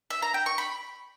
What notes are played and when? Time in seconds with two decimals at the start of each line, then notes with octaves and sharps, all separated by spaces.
0.10 E5
0.22 A#5
0.34 G5
0.46 C#6
0.58 B5